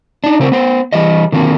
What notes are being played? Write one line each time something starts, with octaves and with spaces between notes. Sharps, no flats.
D4 D#4
C#3 C4 A#4
B3 C5
E3 G3 D#5
D3 D#3 A#3 C4